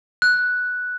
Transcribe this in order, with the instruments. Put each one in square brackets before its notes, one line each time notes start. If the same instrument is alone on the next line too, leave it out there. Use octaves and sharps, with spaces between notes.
[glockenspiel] F#6